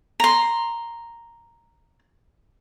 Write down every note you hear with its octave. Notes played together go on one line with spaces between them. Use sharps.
A#5 C6